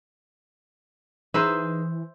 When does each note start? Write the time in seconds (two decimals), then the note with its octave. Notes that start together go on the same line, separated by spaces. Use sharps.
1.34 E3 D#4 G#4 B4 C5 E5